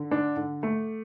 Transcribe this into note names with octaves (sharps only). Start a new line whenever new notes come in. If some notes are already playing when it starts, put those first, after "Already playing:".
Already playing: D3
D4
D3
A3